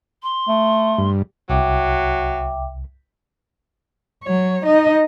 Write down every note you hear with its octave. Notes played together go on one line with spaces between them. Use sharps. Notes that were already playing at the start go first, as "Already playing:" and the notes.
C6
A3
G2
C2 F#3 E5 G5 D6
F#3 C#5
D#4 D#5